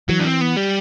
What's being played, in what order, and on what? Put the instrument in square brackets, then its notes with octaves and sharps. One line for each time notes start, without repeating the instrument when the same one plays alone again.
[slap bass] E3 [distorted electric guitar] F#3
[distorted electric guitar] D4
C4
B3
G3